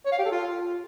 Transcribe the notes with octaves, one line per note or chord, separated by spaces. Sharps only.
C#5
F5
G4
A4
F4